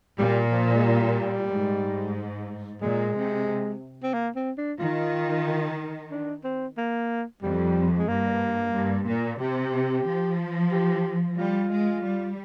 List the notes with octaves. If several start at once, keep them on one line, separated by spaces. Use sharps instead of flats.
A#2 G3
F3
G#3
G3
G#2
A#2 G#3
C3
C4
A#3
C4
D4
D#3 F4
D4
C4
A#3
F2 G3
G#3
G2 A#3
G2
A#2
C3 G4
F3
G4
G3 F4
G#3
G3